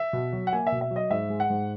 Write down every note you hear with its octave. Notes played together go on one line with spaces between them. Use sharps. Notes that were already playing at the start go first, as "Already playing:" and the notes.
Already playing: E5
B2
F#3
F#5
A#3 G#5
E5
B2
E5
F#3
D#5
G#2 E5
G#3
F#5
G#2